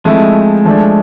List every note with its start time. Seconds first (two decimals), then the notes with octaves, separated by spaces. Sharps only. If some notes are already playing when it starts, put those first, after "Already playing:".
0.05 F3 G#3 A3 C4 E4
0.65 F3 A3 D4